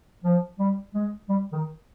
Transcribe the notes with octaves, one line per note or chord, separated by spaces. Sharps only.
F3
G3
G#3
G3
D#3